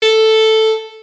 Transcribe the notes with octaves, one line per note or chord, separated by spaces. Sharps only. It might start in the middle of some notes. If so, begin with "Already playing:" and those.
A4